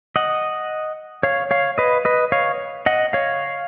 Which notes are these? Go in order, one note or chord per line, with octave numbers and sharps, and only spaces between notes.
D#5 F#5
C#5 F5
C#5 F5
B4 D#5
B4 D#5
C#5 F5
D#5 F#5
C#5 F5